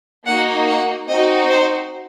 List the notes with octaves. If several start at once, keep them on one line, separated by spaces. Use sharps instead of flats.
A#3 D#4 F#4 F#5
F#5
C4 D#4 F#4 D#5
C5